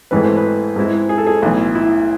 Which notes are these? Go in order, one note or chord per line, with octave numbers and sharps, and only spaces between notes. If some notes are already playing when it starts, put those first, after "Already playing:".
G#1 G#2 E3 A3 B4
C5
B4
G#2 G#3 C4 E4
G#4
A4
G#4
B1 A2 E3
E4